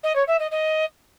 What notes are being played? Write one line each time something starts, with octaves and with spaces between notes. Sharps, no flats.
D#5
C#5
E5
D#5
D#5